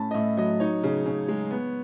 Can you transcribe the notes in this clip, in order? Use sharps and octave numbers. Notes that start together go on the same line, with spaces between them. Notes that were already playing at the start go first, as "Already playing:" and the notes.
Already playing: A2 C#4 A5 B5
D#5
A2 E5
F#3 D#5
D#4 C#5
C#3
C#3
G#3
B3